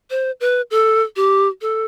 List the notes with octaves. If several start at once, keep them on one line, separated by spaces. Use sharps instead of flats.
C5
B4
A4
G4
A4